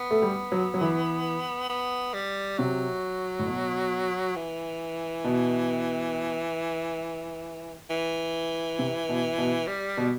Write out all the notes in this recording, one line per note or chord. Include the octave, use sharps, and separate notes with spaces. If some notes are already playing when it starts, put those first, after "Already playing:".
Already playing: B3
A3
G3
F#3
F#3
E3
B3
G3
C3 F#3
A2
B2
E3
B2
E3
C3
B2
B2
G3
B2